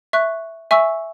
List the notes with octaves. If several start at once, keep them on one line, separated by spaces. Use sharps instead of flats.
E5 C#6 F#6
E5 G#5 C#6 E6